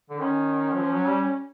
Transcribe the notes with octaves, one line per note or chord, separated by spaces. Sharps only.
D3
D#3 C#4
F#3
F3
F#3
G3